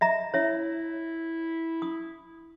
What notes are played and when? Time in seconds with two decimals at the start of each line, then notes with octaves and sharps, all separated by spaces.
0.01 D#5 E5 A#5
0.34 E4 C#5 E5
1.82 D#6